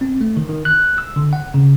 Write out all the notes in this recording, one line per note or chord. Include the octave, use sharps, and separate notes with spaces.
C4
A3
D#3
D#3
F#6
E6
D3
F#5
C#3